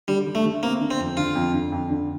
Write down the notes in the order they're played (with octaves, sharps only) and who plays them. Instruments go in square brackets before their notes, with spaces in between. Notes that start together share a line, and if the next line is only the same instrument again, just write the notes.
[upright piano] D3 [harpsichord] G3
[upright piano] D3
[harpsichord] A3
[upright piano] D3
[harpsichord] A#3 [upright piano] C4
[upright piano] D3
[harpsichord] C4
[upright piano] F2
[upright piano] D3 [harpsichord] F4
[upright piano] F2
D3
F2
D3